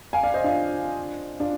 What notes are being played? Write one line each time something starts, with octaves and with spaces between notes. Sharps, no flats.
F5 G#5
D5 F5
C5 D#5
D4 F4
D4 F4